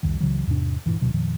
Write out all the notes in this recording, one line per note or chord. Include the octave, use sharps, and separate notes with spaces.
C2 F2 D#3
C#2 C#3 E3 F#3
E2 G#2 C3 D4
E1 G2 A#2 E3
D#1 D2 B2 F#3
F2 A#2 D#3 F3